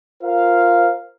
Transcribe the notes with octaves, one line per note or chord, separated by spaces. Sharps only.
F4 A#4 C5 F5